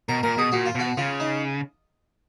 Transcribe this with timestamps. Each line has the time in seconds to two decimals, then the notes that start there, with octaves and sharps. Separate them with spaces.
0.09 B2 A#4
0.23 A#2 A#4
0.38 B2 G#4
0.52 A#2 F#4
0.66 F4
0.75 B2 F#4
0.97 C#3 F4
1.20 D#4